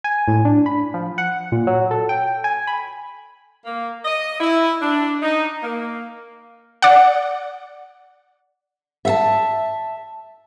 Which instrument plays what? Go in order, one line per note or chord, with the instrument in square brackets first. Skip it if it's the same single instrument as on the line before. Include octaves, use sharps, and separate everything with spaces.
[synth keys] G#5
A2
D4
B5
F3
F#5
A#2
F#3
A4
G5
G#5
B5
[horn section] A#3
D#5
E4
D4
D#4
A#3
[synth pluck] D5 F#5
[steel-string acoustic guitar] E5 F5 A5